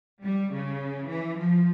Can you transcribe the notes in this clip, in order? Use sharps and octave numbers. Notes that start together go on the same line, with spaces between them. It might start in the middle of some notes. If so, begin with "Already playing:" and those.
G3
C#3
E3
F3